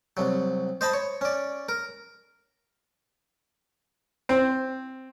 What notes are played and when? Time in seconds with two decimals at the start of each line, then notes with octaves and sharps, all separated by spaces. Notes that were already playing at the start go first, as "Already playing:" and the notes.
0.17 C2 F#3
0.81 C5 D#5 A5 B5
0.93 C#5
1.21 C#4 D5
1.69 A#4
4.29 C4